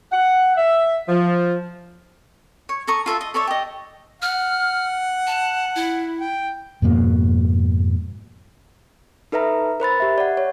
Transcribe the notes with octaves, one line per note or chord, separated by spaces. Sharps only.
F#5
E5
F3
C#5
A4 A#5 C#6 D#6
F4 A4 E5 A5
D#5
A4 C#5 D5 E5
G4 D#5
F#5 F6
A5
E4
G5
F2 G#2 B2 A#3
D#4 A4 B4 E5 A#5
A#4 C5 B5 A6
G4 E5
D5 F#5
C#5